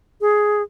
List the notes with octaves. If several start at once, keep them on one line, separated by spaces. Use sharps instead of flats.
G#4